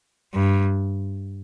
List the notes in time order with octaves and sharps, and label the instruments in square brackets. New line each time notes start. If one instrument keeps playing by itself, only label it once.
[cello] G2